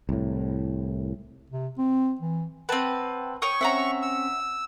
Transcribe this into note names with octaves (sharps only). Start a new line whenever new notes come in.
C2 A2
C3
C4
E3
C4 B4 F#5 G5 A5
C#5 G5 C#6 D#6
C4 C#4 E5 F#5 A#5
E6